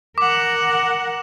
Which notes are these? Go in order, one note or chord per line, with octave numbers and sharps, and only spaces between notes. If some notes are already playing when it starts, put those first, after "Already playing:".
A#4 F#5 D6